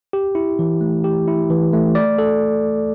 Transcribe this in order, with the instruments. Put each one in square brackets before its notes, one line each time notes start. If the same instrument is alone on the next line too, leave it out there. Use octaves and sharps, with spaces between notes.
[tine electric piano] G4
E4
E3
A3
G4
E4
E3
A3
D5
A4